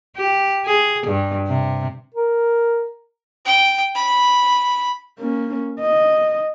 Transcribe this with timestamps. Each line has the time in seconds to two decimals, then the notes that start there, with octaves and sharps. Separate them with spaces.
0.17 G4
0.65 G#4
1.07 G2
1.47 C3
2.14 A#4
3.45 G5
3.95 B5
5.19 A#3 C#4
5.80 D#5